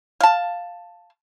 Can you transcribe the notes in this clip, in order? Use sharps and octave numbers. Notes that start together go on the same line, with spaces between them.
F5 A5